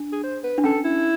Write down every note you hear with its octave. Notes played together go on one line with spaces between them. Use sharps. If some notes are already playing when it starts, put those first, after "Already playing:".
Already playing: D4
G#4
C5
B4
D4
C#4 A4
E4